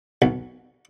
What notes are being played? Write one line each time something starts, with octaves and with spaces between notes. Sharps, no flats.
B1